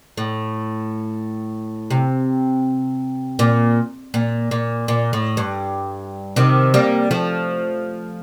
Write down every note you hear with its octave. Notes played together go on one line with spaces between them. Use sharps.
A2
C3
A#2
A#2
A#2
A#2
A2
G2
C3 D#3
G3 A#3
F3 A3